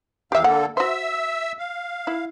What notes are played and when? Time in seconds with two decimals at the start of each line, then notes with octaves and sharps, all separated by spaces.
0.32 E2 G4 E5 F5
0.44 D3 A#3 A4 F#5
0.77 F#4 C5 E5 E6
1.59 F5
2.07 E4